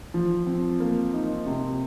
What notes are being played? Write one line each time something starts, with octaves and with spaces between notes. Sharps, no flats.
F3
C4
A#3
D#4
C3